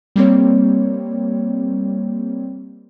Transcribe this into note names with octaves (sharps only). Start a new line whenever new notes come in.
G3 A#3 C4 C#5